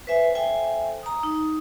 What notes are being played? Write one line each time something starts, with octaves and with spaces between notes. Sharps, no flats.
B4 C5 E5 G#5
A4 C5 E5 G5 G#5
A#5 D#6
D#4